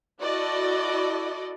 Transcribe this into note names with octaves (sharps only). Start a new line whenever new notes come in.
E4 F#4 A4 D5 D#5